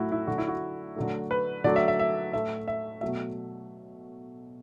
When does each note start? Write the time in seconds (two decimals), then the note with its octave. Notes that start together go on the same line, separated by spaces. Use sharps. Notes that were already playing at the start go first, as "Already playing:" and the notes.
Already playing: A2 F#3 A3 E4 F#4
0.12 E4
0.27 D3 F#3 A3 F#4
0.38 E4
0.48 F#4
0.96 D3 F#3 A3
1.31 B4
1.64 D3 F#3 A3 D5
1.76 E5
1.88 E5
1.99 E5
2.33 A2 A3 E5
2.68 E5
3.01 B2 F#3 A3 E5